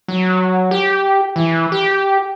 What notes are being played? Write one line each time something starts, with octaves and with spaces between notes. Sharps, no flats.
F#3
G4
E3
G4